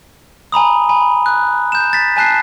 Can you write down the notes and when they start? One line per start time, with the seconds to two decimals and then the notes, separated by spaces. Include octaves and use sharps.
0.52 G#5 A#5 B5 D#6
0.89 G#5 B5
1.26 F#6
1.72 G6 E7
1.93 A6 B6
2.17 G#5 A5 F#6 C7